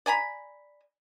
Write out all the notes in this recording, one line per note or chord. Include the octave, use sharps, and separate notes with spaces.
D5 G#5 A#5 B5